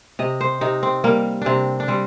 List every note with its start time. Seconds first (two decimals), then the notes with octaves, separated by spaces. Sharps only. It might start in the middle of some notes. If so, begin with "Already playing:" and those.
0.19 C3 D#5
0.41 C5
0.61 C3 D#4
0.83 C4
1.04 G3 A#3
1.42 C3 C4 D4
1.80 D4
1.88 G3 C4